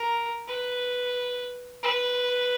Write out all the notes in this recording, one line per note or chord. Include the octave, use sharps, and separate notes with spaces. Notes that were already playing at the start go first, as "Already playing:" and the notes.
Already playing: A#4
B4
B4